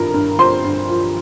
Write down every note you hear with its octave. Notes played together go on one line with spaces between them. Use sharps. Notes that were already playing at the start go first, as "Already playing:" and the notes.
Already playing: G2 F3 A#4 A#5
G2
F3 C5 C6
G2
F3